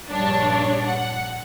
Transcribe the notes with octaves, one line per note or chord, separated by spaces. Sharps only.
A#1 G2 D4 C#5
F#5